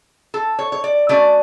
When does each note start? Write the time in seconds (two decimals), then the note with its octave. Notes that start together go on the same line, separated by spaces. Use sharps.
0.34 A4
0.59 C#5
0.72 C#5
0.84 D5
1.09 B2 A3 C#4 D5